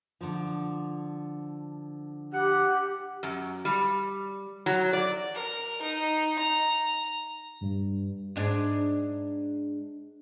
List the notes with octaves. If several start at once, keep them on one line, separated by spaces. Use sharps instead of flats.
D3 F3
G4 F#5
F#2
G3
F#3
D5
A#4
D#4
A#5
G2
G#2 D4 G#4